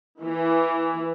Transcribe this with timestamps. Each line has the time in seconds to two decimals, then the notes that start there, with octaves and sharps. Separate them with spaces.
0.22 E3